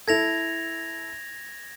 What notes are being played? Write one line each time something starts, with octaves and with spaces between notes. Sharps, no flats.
E4 A4 G#6 A#6 F7